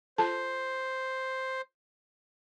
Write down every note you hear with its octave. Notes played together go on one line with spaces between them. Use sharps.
F4 A4 C5 A5